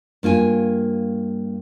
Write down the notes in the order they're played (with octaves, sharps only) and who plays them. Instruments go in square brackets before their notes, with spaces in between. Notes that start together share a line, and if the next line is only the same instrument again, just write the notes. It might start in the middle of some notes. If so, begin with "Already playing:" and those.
[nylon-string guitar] G2 A#3 F4 G#5